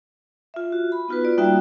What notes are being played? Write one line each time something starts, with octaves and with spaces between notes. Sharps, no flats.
F4 E5
F#4
B5
B3 D#4 F4 F#4 B4
F4 D5
G3 A#3 D#4 F#4 E5 G5